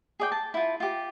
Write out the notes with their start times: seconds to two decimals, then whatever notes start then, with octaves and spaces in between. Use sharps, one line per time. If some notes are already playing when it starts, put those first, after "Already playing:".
0.20 G#4 D5 G5
0.32 A5
0.54 E4 F4
0.80 F4 G4